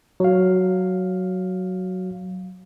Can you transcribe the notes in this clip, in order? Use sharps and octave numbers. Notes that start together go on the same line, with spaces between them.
F#3 F5